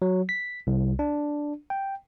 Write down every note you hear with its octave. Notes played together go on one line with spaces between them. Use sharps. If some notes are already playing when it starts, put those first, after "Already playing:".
F#3
B6
C2
D4
G5